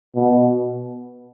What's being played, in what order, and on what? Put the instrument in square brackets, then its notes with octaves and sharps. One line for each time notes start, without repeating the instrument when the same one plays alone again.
[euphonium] B2